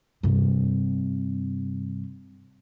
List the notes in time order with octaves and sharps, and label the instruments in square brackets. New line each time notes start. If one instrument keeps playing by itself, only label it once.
[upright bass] G2 C3